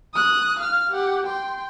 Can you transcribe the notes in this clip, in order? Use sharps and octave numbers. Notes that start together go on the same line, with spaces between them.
D#6 F#6
F5 F6
G4 F#5
G5 C6